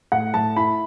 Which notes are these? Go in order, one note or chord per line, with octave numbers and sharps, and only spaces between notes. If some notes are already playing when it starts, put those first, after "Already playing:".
A2 F#5
A2 A5
E4 B5